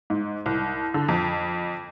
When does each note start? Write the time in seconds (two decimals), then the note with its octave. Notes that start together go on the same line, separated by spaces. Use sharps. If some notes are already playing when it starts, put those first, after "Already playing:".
0.10 G#2
0.46 C2
0.94 D3
1.08 F2